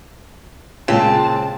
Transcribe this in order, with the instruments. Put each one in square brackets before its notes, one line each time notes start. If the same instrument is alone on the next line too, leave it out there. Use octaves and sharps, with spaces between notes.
[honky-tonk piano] A#2 G#3 [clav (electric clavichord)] C#3 [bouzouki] C4 [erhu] A5